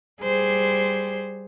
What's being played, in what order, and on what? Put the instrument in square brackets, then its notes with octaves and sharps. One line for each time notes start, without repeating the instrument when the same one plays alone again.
[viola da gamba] G3 G#4 C5